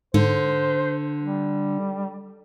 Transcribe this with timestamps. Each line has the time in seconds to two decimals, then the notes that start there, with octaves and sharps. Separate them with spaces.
0.14 G#2 D3 C5
1.23 G3